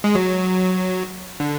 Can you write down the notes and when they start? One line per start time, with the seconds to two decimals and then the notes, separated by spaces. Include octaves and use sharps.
0.04 G#3
0.15 F#3
1.40 D3